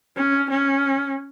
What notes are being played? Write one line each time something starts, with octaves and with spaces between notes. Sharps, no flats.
C#4
C#4